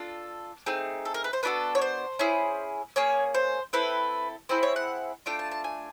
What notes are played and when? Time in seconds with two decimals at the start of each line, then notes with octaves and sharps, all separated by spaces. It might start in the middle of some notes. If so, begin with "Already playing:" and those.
Already playing: D4 F4 A4
0.66 A3 C4 D#4 G#4
1.05 A4
1.14 A#4
1.24 B4
1.33 C5
1.43 B3 D4 F#4 A4 B4
1.75 C#5
1.82 C5
2.19 C#4 E4 G#4
2.96 A#3 C#4 G#4 C#5
3.34 C5
3.73 C4 E4 A4 B4
4.49 C4 E4 G#4 C5
4.63 C#5
4.76 F#5
5.26 A3 D4 F4 G5
5.39 A5
5.51 A5
5.64 G#5